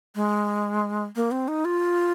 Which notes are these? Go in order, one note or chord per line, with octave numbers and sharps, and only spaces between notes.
G#3
A#3
C4
D#4
F4